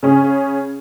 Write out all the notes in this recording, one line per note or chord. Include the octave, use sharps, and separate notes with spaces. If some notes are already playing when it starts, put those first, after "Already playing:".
C#3 C#4 G#4